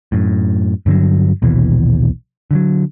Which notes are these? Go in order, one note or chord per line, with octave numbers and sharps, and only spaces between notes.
F#2 A2
G2 D3 D#3 F#3
A#1 D#2 B2 E3
D3 F3 F#3